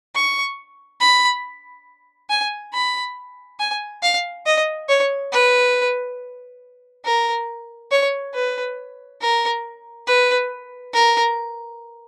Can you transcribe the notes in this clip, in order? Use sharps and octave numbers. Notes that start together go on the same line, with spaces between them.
C#6
B5
G#5
B5
G#5
F5
D#5
C#5
B4
A#4
C#5
B4
A#4
B4
A#4